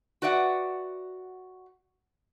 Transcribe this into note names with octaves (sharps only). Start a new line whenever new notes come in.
F#4 B4 D5 E5 F#5